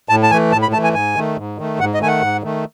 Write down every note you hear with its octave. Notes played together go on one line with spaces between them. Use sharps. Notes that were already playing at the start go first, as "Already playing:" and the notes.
A2 A5
A5
E3 A3 G#5
A2 A5
B5
E3 A3 A5
G#5
G#2 G#5
D#3 A3
G#2
D#3 A3
G#2 F#5
D#5
D#3 A3 G#5
F#5
G#2
D#3 A3